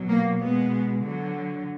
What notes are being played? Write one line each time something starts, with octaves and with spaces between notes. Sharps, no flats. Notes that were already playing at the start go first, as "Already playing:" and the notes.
Already playing: B2 F#3
A#3
B2 G#3 B3
D3 F#3